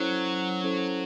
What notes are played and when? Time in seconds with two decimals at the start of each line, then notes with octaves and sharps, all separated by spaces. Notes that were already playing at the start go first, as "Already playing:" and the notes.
Already playing: F#3 C#4 E4 A4 C5
0.64 C#4 E4 A4 C5